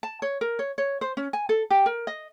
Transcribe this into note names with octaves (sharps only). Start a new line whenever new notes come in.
A5
C#5
A#4
C#5
C#5
C5
C#4
G#5
A4
G4
A#4
D#5